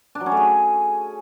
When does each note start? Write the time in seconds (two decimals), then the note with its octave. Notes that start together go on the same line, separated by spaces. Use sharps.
0.15 D4
0.21 F#3
0.26 C#4
0.32 A3
0.37 G#4